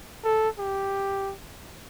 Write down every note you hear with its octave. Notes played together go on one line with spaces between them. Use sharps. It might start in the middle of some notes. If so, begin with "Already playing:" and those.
A4
G4